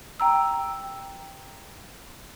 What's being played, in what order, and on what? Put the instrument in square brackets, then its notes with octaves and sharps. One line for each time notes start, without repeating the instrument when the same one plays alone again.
[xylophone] G5 A#5 E6